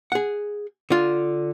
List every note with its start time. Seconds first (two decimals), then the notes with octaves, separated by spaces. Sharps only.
0.12 G#4 F#5
0.90 D3 F4